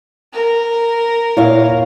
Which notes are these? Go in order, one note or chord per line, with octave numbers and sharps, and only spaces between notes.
A#4
A#2 E4 C#5 F5